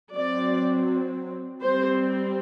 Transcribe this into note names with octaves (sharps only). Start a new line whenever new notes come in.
F#3 C4 D5
G3 C4 C5